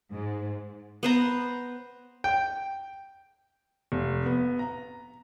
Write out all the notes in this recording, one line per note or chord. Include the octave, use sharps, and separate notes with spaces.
G#2
B3 C5 A#5
G5
F1
B3
A#5